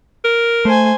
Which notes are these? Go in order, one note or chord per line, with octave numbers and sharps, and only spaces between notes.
A#4
A3 C5 G#5